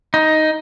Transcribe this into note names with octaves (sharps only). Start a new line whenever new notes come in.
D#4